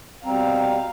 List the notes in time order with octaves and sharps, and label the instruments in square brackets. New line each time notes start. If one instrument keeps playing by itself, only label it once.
[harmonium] B2 G3 [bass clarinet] C4 [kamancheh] F5 [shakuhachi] A#5